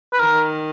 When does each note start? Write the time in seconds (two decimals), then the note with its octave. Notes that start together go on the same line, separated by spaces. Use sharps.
0.13 B4
0.20 D#3 A#4